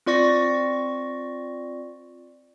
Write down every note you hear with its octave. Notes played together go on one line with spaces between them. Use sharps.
C4 F4 D5 C#6 A#6